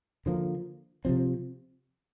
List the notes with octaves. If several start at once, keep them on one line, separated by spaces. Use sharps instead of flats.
D3 F3 A#3
C3 F3 C4